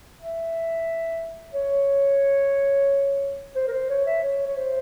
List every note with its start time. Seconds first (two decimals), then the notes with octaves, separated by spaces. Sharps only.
0.20 E5
1.54 C#5
3.55 C5
3.67 A#4
3.73 C5
3.89 C#5
4.06 E5
4.23 C#5
4.46 C#5
4.56 C5